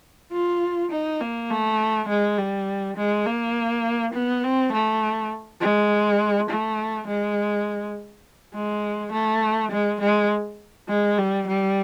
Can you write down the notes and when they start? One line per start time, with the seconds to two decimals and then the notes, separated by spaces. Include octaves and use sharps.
0.33 F4
0.91 D#4
1.21 A#3
1.51 A3
2.09 G#3
2.38 G3
2.97 G#3
3.26 A#3
4.14 B3
4.44 C4
4.73 A3
5.61 G#3
6.49 A3
7.07 G#3
8.54 G#3
9.12 A3
9.72 G#3
10.01 G#3
10.89 G#3
11.18 G3
11.48 G3